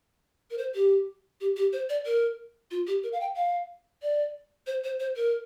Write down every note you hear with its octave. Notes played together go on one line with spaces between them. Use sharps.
A#4
C5
G4
G4
G4
C5
D5
A#4
F4
G4
A#4
F5
G5
F5
D5
C5
C5
C5
A#4